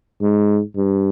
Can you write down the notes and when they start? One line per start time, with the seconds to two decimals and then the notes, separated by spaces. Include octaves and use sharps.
0.22 G#2
0.76 G2